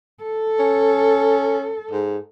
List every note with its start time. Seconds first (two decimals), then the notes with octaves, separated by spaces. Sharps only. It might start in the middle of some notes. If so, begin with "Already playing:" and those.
0.23 A4
0.59 C#4
1.91 G#2